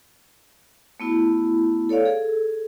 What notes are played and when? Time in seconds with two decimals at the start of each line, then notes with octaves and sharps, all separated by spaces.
1.00 A3 B3 E4 F#4
1.89 A4 C#5 D5 F5
2.05 G#4 A4